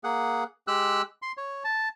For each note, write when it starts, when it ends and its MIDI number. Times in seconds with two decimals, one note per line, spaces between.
0.04 0.44 58
0.04 0.44 68
0.04 0.44 78
0.67 1.02 56
0.67 1.02 67
0.67 1.02 88
0.67 1.02 90
1.22 1.32 84
1.37 1.64 73
1.64 1.89 81